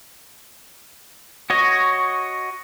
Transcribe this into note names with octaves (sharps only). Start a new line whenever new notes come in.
F#4 C#5 D#5